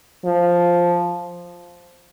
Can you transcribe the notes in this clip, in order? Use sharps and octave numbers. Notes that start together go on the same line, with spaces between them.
F3